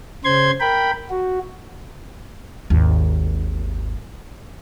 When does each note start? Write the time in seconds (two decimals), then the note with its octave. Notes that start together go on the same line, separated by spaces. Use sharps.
0.25 C#3 C5 C6 G#6
0.60 A#4 G5 B5
1.10 F#4
2.70 G#1 D#2